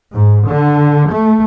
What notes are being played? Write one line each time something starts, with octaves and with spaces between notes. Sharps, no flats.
G#2
D3
A3